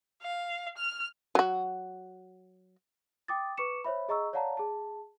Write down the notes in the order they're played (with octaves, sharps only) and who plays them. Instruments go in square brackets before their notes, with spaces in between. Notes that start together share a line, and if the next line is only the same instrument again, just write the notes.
[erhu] F5
F6
[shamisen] F#3 F#4
[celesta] G5 D6 D#6 A6
B4 C#6 D6 C#7 E7
C5 C#5 E5 B5
G#4 D#5 A#5 C#6 E6
C#5 D5 F5 F#5 A5 A#5
G#4 A5